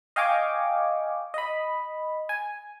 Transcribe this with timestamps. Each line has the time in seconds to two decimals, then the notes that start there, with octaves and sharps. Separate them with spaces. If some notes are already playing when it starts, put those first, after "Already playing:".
0.16 D#5 F5 G5 G#5 C#6 D6
1.34 D#5 B5
2.29 G#5